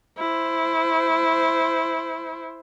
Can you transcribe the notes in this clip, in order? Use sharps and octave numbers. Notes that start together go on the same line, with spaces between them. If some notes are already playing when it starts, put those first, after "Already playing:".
E4 C5